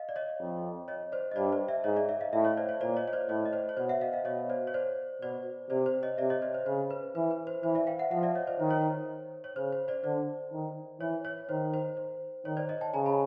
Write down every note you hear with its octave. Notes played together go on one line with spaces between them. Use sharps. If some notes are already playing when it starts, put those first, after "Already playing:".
Already playing: D#5 F5
D5
C#5 D#5
F2
C#5 D#5
C5 D5
D#5
G2 C5 D5
C5 D5
D5 E5
G#2 C#5 D#5
D5 E5
D5 E5
D#5 F5
A2 D5 E5
C#5 D#5
C5 D5
C#5
A#2 C5 D5
C#5 D#5
C#5
C5 D5
A2 C#5 D#5
D#5
C5 D5
C#5
B2 C5 D5
E5 F#5
D#5 F5
D#5 F5
B2 C#5 D#5
C5 D5
C#5
C5 D5
B2 C5 D5
C3 C5 D5
C5
C#5 D#5
C3 D5 E5
C#5 D#5
C5 D5
C5
C#3 C5
B4
E3 B4
B4
C5
E3 C5
D5 E5
F5 G5
E5 F#5
F3 E5 F#5
D5 E5
C#5 D#5
C5 D5
D#3 C5
C#5
C5
C#5
C#3 C5
C5
C5 D5
D3 C5 D5
D#3
E3 C#5
C#5
D#3 C5
C5
C5
D#3 C#5
C5 D5
C#5 D#5
G5 A5
C#3 G#5 A#5
A5 B5